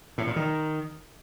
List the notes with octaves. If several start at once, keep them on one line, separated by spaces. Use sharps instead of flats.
A2
A#2
D#3